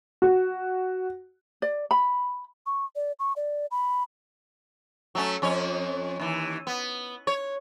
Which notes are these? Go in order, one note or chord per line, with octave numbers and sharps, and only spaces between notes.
F#4
D5
B5
C#6
D5
C#6
D5
B5
F#3 A3 C#4
F2 C#4 C#5
D#2 E3
B3
C#5